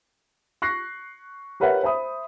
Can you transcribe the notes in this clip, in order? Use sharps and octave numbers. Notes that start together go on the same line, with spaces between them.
C#6 F#6 A#6 C7
G4 A#4 B4 C#5 E5 F#5
C5 E5 B5 D#6